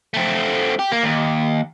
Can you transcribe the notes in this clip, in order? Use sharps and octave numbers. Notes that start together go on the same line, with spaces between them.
A3 C4
G4
A#3
D#2